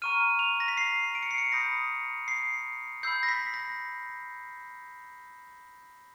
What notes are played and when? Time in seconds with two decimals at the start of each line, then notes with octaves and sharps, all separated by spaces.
0.02 A#5 C#6 F6 D#7
0.39 F7
0.60 A#6
0.68 B6
0.77 C7
1.15 D7
1.23 C#7
1.31 C7
1.38 C#7
1.52 B5 D#6 G6 A#6
2.28 C7
3.03 B5 E6 G6 C7
3.23 A#6
3.28 B6
3.54 A#6